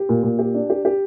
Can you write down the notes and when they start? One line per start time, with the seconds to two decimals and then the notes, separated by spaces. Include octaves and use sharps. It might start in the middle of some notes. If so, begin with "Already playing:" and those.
Already playing: G4
0.09 A#2
0.23 A#2
0.39 G4
0.54 D4
0.70 G4
0.85 G4